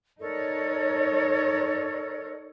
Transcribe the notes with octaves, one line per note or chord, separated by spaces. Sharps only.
D#4 A4 A#4 C#5 D5